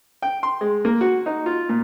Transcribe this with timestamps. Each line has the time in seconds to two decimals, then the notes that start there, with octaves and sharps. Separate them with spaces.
0.22 G5
0.43 C6
0.61 G#3
0.85 A#3
1.01 F#4
1.26 D#4
1.46 F4
1.69 A#2